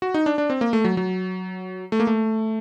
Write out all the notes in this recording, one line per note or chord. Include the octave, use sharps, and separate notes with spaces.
F#4
D#4
D4
D4
C4
A#3
A3
F#3
F#3
A3
A#3
A3